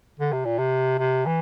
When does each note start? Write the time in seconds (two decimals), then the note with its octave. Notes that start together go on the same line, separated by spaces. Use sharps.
0.19 D3
0.32 C3
0.45 A#2
0.58 C3
0.99 C3
1.26 E3